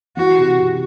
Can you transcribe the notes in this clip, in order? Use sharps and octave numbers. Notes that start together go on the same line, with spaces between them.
E3 F#4
C3
C3